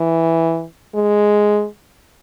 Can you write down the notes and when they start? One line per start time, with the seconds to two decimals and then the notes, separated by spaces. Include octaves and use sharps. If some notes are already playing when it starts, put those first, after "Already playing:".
Already playing: E3
0.95 G#3